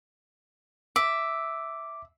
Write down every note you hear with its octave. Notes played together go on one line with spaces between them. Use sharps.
E5 D6